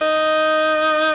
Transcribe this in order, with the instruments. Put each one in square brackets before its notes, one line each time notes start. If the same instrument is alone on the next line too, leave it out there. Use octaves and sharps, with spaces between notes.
[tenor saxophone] D#4